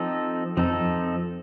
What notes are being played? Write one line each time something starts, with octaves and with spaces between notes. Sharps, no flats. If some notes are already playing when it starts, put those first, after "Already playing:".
Already playing: F3 C4 D#4 A4
F2 F3 C4 D#4 A4